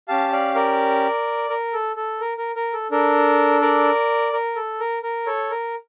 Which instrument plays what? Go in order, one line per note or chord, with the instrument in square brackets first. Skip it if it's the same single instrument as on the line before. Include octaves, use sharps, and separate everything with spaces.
[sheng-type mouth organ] C#4 G4 F5 A5
D5 F5
A#4 D5
A#4
A4
A4
A#4
A#4
A#4
A4
D4 A4 A#4
A#4 D5
A#4
A4
A#4
A#4
A4 C#5
A#4